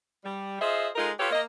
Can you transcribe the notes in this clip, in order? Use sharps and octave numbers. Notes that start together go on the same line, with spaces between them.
G3
F4 G#4 C5 D#5 E5
G#3 D#4 F4 A4 A#4
F4 G4 A4 B4 C#5
A#3 D#5